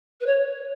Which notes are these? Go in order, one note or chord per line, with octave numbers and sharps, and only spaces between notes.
B4
C#5